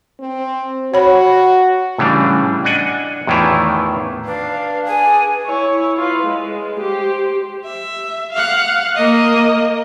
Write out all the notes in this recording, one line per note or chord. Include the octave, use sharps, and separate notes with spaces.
C4
F#4 C#5 B5
A2 C#3 E3 G3 D4
D4 D#5 F#5 G#5
E2 A2 D#3 E3 E4 F4
D4 B4 F5
G#4 B4 G#5
E4 C#5
F4 B4
G#3
G4 C5
E5
F5 F#5
A#3 D#5